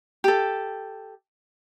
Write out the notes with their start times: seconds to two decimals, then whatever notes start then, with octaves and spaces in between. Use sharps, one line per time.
0.24 G4 A4